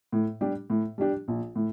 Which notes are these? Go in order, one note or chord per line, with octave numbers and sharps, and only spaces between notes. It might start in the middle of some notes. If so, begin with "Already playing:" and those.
A2
G3 D4 G4
A2
G3 D4 G4
A#1
A2